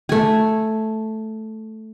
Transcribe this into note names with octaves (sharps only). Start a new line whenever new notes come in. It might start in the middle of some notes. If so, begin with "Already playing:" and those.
A3 G#5